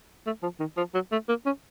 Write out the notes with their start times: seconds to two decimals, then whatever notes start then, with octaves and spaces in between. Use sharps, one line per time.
0.27 A3
0.43 F3
0.60 D#3
0.77 F3
0.94 F#3
1.12 A3
1.29 A#3
1.46 C#4